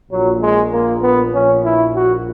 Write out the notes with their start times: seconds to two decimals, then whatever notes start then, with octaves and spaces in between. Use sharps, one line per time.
0.11 A#1 A#2 F#3
0.42 G#3
0.73 A#3
1.03 B3
1.34 A#1 A#2 C#4
1.65 E4
1.95 F#4